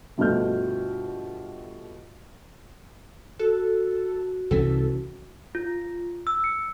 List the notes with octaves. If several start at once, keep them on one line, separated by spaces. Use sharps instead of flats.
G2 B2 F3 A3 F6 G6
F#4 A4
C2 E3 C#4 A4
F4
E6
C#7